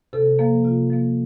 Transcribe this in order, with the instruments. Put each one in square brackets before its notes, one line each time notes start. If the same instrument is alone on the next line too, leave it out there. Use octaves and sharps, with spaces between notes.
[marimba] C3 A4
F3 A#3
C3 F4
F3 A#3